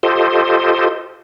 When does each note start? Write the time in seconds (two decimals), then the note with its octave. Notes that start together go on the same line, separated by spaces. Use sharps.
0.03 F4 G4 A4 C5 D#5